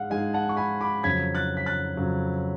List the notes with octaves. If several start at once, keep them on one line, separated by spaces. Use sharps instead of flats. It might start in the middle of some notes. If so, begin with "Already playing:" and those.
Already playing: G#2 G#3 F5 F#5
G#2 G#3 F5 G#5
F#5 A5
C#6
G#5 B5
B5 D6
F2 C#3 F#3 G#6 B6
F#6 A6
B6
F#6 A6
F2 C#3 F#3